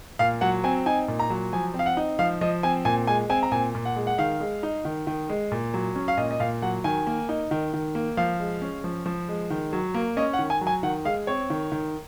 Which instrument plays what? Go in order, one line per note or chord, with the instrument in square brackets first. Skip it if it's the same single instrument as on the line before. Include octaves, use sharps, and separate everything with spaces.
[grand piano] A#2 F5
F#3 F#5
C4 G#5
D#4 G#5
A#2
A#5
F#3
F3 G#5
C4
F5
F#5
D#4
F3 F5
F3 D#5
C4 G#5
A#2 G#5
G#3 G#5
C4 G#5
A#5
A#2 G#5
A#2
F#5
G#3
F#5
D#3 F5
G#3
D#4
D#3
D#3
G#3
A#2
F#3
C#4
F5
A#2 D#5
D#5
A#2 F5
F#3 F#5
D#3 G#5
A#3
D#4
D#3
D#3
A#3
F3 F5
G#3
C#4
F3
F3
G#3
D#3
F#3
A#3
C#4 D#5
F#5
D#3
G#5
F#3
G#5
D#3 F#5
G#3 F5
C4 C#5
D#3
D#3